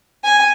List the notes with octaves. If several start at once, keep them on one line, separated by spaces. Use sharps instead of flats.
G#5